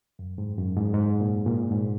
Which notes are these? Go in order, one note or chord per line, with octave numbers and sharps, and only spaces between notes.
F#2
G#2
F#2
G#2
G#2
A#2
A#2
G#2